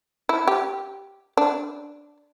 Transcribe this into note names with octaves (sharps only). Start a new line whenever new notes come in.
E4
G4
D4